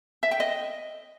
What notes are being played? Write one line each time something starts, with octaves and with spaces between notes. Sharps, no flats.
E5
G5
D#5